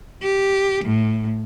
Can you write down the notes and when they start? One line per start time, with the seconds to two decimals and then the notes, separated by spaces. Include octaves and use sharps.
0.23 G4
0.84 A2